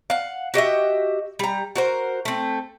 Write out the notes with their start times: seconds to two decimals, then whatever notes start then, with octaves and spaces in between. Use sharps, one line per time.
0.10 F5 F#5
0.54 F#4 G4 D#5 E5
1.39 G3 A#5
1.75 F#4 A#4 C5
2.25 A3 C4